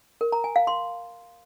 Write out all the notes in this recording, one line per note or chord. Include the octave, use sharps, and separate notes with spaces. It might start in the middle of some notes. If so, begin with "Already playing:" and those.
A#4
A#5
G#5
F5
C6